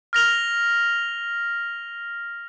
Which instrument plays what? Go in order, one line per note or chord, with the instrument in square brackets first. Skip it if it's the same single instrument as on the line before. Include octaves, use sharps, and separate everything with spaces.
[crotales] F6 A#6 F7 G7